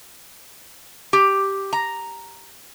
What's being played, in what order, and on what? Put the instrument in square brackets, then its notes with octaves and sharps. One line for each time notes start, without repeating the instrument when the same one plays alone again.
[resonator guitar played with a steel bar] G4
A#5